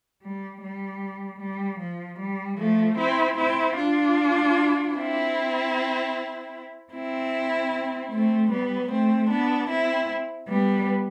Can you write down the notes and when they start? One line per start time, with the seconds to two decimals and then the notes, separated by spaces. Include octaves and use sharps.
0.22 G3
0.61 G3
1.40 G3
1.80 F3
2.19 G3
2.58 F3 A3
2.98 C4 E4
3.37 C4 E4
3.77 D4 F4
4.95 C4 E4
6.92 C4 E4
8.11 A3 C4
8.50 G3 B3
8.90 A3 C4
9.29 B3 D4
9.69 C4 E4
10.48 G3 B3